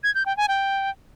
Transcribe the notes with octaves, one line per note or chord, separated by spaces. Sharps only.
G#6
G6
G5
G#5
G5